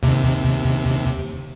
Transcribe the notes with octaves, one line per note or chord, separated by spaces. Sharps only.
D#2 C3